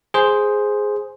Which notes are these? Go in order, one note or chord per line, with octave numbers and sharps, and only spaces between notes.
G#4 C5